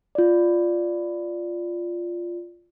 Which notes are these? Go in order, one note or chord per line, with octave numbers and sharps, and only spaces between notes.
F4 D5